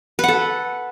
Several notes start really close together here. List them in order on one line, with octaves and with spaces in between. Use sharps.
B4 F#5 A4